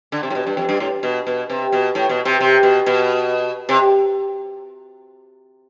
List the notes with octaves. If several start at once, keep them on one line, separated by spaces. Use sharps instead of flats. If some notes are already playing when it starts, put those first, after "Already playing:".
D3
C3
A2
B2
G2
F2
G2
A2
B2
B2
C3
B2
A2
B2
C3
C3
B2
B2
C3